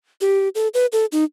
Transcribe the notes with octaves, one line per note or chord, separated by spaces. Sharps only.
G4
A4
B4
A4
D#4